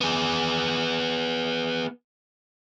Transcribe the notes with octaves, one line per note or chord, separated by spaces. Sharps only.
B3 G#4